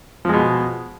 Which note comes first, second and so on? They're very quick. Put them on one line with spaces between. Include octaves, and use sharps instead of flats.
F3 G#3 B2